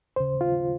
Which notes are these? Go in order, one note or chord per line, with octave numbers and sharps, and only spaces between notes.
D#2 C#3 C5
F4